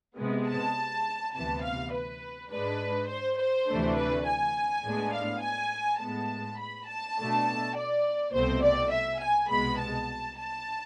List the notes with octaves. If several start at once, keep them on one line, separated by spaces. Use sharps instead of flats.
C3 G#3 B3
A5
D2 C3 E3 B3 A5
F5
B4
G#2 G#3 D4 B4
C5
C5
D2 C3 E3 A3 D4
B4
G#5
A2 G#3 B3 D4
F5
G#5
A2 G#3 B3 A5
B5
A5
B2 A3 D4
D5
C2 B2 A3 C4 C5
D5
E5
G#5
C2 B2 G#3 B3 B5
A5
A5